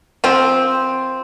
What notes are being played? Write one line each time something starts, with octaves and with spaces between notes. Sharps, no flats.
F3 C4